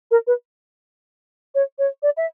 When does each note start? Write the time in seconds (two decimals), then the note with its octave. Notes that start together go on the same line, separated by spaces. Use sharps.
0.11 A#4
0.27 B4
1.55 C#5
1.79 C#5
2.03 D5
2.17 E5